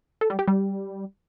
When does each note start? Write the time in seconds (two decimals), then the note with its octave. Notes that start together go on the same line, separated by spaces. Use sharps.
0.21 A4
0.30 G3
0.39 G4
0.48 G3